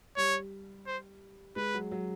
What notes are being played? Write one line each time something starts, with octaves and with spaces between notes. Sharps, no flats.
G3 C#5
C5
G#3 B4
F#3
F#3